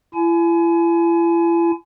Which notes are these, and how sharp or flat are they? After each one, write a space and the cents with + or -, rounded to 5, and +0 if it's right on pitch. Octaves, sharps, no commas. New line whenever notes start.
E4 +40 G#5 +30